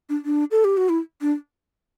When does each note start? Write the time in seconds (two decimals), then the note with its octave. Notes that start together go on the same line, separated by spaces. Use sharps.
0.09 D4
0.25 D4
0.51 A4
0.64 G4
0.77 F#4
0.89 E4
1.21 D4